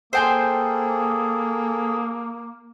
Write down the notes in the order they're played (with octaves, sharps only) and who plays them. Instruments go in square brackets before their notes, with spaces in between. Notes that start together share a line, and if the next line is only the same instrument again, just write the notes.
[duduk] A#3 [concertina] G#4 A4 [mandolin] C5 G5 G#5